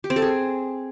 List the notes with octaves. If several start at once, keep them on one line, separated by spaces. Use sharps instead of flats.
G4
C4
A4
G#4